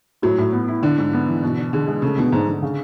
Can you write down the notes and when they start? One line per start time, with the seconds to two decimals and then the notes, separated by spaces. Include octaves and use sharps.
0.22 A2 F#3
0.38 A2
0.53 B3
0.68 E4
0.83 D3 D4
0.98 G#2
1.13 B3
1.28 E3
1.43 B2
1.57 D4
1.73 D3 G#4
1.88 G#3
2.02 C#3 A3
2.18 B2 D3
2.32 G#2 D3
2.48 D3
2.63 C#3